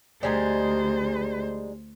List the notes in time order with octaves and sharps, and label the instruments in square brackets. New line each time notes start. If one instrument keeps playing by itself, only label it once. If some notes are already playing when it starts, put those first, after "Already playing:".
[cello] D2 C5 [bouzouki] G3 G#3 D#4